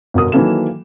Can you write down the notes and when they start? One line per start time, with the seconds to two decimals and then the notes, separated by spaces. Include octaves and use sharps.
0.14 G1 B2 F#4 A#4 D#6
0.32 D#3 E3 F#3 A#3 A4 E7